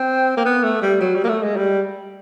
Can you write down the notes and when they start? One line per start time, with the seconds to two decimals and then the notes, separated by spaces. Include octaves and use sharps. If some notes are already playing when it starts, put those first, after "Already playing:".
Already playing: C4
0.37 A#3
0.46 B3
0.64 A3
0.82 G3
1.01 F#3
1.15 G3
1.24 A#3
1.29 A3
1.43 G#3
1.57 G3